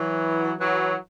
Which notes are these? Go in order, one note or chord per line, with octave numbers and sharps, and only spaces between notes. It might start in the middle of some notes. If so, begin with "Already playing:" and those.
Already playing: E3 F#3
E3 F#3